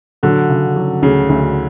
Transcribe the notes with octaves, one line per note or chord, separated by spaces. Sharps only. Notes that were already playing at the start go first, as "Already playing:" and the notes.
D3 F#3
C#3
F#3
D2 C#3
D2